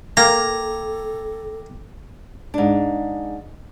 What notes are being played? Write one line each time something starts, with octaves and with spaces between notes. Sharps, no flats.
A#3 A4 G5 A#5 D6 G#6
G#2 D4